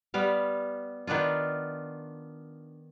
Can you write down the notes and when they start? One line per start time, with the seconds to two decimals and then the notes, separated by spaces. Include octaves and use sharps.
0.14 G3 B3 F5
1.07 D#3 B3 D4 F4